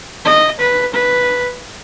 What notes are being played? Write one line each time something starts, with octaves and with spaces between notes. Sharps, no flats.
D#5
B4
B4